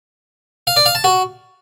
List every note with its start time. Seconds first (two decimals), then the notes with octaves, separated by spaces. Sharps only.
0.67 F5
0.76 D5
0.86 F5
0.95 A5
1.04 F#4